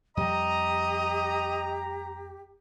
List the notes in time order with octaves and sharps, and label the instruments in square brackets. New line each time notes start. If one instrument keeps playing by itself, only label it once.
[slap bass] F2 G3 [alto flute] G4 [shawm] D#5 [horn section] A#5